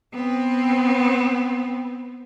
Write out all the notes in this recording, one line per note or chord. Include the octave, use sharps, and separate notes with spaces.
B3 C4